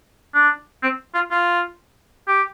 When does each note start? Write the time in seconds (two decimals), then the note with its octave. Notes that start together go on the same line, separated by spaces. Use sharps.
0.34 D4
0.83 C4
1.15 F4
1.31 F4
2.28 G4